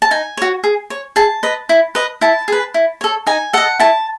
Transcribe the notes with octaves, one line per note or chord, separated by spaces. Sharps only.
A5
D#4 G#5
F#4 C#5
G#4
C#5
G#4 A5
B4 D#5
E4
B4 D#5
E4 A5
G#4 B4
E4
A4 C#5
D#4 G#5
A4 D#5 F#5
E4 A5